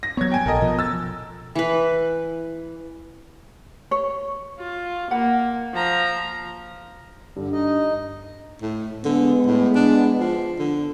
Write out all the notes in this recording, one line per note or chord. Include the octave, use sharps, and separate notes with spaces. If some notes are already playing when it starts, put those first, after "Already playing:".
A#6
F#3 B3 C#5 G#6
G5 G#5
A#1 A4 A#4 D#5
B2 F3
E6 A6
E3 B4
C#5
F4
A#3 F#5 B5
F3 A#5
G2 D3
D#4 D#5
A2
D3 G#3 B3
A2
D4
F3
D3